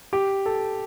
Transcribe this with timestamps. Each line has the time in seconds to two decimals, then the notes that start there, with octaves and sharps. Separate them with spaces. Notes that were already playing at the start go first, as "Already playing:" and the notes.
0.13 G4
0.46 A4